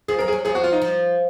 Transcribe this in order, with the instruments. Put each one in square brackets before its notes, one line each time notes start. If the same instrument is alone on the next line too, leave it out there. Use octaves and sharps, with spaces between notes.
[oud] F3 [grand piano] G#4
[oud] F#3 [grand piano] A#4
[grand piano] G#4
[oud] F#3
[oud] F3 [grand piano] G#4
[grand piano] F#4
F4
D#4
[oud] F3